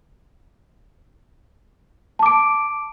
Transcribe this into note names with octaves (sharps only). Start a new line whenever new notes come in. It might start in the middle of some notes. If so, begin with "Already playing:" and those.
A5 D6 D7